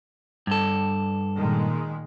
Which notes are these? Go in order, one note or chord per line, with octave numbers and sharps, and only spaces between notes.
G2 A4
A#2 D#3 G#3